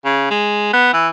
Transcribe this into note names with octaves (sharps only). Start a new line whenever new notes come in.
C#3
G#3
B3
E3